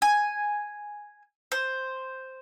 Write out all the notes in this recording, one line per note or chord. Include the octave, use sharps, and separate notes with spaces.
G#5
C5